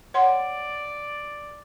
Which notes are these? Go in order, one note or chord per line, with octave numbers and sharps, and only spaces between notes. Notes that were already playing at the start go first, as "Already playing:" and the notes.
C#5 D5 F#5 C6